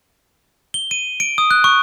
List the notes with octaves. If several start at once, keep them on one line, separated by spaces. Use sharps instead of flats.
G7
D#7
D7
D#6
F#6
C#6